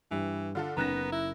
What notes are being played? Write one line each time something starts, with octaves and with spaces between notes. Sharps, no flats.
G2 E3 G3
D3 F4 A4
F#1 B3 C#4 D#4 A#5 F#6 A#6 E7
E4